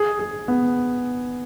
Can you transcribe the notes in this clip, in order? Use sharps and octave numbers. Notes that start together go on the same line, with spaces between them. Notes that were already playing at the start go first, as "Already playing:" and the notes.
Already playing: G#4
G#4
B3